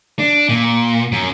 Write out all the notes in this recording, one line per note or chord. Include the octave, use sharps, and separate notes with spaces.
D4
A#2
F#2